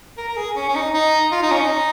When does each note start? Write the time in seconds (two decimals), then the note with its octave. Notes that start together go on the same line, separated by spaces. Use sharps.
0.18 A#4
0.29 A#4
0.37 G#4
0.56 C#4
0.69 C#4
0.75 D#4
0.94 D#4
1.32 F4
1.43 D#4
1.51 C#4
1.61 D#4